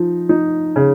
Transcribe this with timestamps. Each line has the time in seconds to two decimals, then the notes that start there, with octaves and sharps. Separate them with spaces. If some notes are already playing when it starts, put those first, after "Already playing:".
Already playing: F3 D#4
0.29 D#4
0.76 C#3